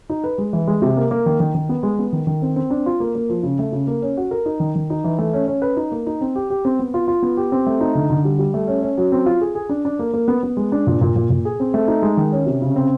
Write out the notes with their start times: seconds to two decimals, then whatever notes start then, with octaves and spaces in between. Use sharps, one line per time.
0.10 D#4
0.24 B4
0.38 G#3
0.53 E3
0.67 G#3
0.82 C3
0.97 A#3
1.11 A#3
1.26 D#3
1.40 D#3
1.55 D#3
1.69 B3
1.83 G#3
1.99 B3
2.13 D#3
2.27 D#3
2.42 C4
2.56 C4
2.70 D4
2.86 F4
3.00 A#3
3.15 A#3
3.30 F3
3.43 C#3
3.59 A3
3.72 C#3
3.87 A#3
4.02 C#4
4.17 F#4
4.31 A#4
4.46 D#4
4.60 D#3
4.75 D#3
4.90 D#4
5.04 E3
5.19 A3
5.33 C#4
5.47 C#4
5.62 B4
5.77 D#4
5.92 A#3
6.07 D#4
6.21 C4
6.35 G4
6.50 G4
6.65 C4
6.79 B3
6.94 F4
7.08 F4
7.22 B3
7.37 G4
7.52 C4
7.67 A3
7.81 D#4
7.95 D3
8.10 D3
8.24 G3
8.39 G3
8.54 A3
8.67 C#4
8.82 C#4
8.98 F#3
9.12 C4
9.26 F4
9.41 G#4
9.55 G#4
9.69 D4
9.85 D4
9.99 A#3
10.14 A#3
10.28 B3
10.43 B3
10.57 G#3
10.72 D4
10.87 A#2
11.01 A#2
11.16 A#2
11.30 A#2
11.45 G#4
11.60 C4
11.74 A3
11.88 D#4
12.02 G#3
12.17 D#3
12.32 C#4
12.46 C3
12.62 C#3
12.76 C4